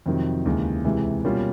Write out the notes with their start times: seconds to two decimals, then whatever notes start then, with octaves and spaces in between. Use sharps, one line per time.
0.06 F2 C3 D#3 F#3
0.45 D#2 C#3 E3 G#3
0.85 C#2 C3 E3 G#3
1.25 B2 G3 A#3 C#4 F4